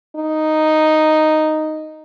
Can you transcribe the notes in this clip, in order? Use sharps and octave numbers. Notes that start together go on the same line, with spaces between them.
D#4